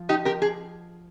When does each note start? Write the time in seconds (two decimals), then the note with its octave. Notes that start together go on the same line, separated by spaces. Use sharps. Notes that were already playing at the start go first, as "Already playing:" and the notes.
Already playing: F3
0.09 D#4 G4
0.25 G4 A#4
0.42 G#4